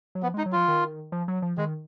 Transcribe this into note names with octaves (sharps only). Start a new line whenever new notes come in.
F#3
F3 B3
G#3
D#4
F#3
F3 F4
D#3
F3
F#3
F3
D#3 G#3